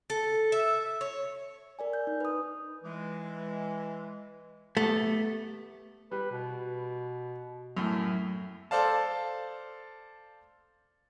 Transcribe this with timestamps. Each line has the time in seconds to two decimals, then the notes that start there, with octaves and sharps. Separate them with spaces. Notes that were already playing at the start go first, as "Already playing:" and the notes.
0.10 A4
0.52 E5
1.01 C#5
1.79 A#4 D5 G#5
1.93 G6
2.07 D#4
2.20 B4 D#6
2.84 E3 G#3
4.77 A3 B3 G4
6.12 G3 B4
6.32 B2
7.77 F#2 A2 A3
8.71 A4 C5 D5 F5 A5